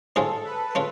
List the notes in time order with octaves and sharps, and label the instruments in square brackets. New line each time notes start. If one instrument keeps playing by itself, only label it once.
[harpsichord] G#2 G#3 C#4 F4 G#4 [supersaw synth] A4
[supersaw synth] B4
[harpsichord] G#3 C#4 F4